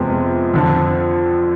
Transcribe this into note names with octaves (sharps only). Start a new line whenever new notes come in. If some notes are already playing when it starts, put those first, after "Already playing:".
Already playing: F2 C3 G#3 B3
F2 D3 F3